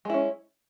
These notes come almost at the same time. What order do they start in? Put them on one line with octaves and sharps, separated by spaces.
G#3 E4 C#4